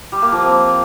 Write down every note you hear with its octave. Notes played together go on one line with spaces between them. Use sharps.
G3
A#3
F3
C4